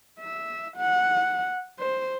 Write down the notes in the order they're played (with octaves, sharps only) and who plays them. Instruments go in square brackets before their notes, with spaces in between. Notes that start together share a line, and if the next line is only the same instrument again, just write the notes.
[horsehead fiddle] E5
F#5
C5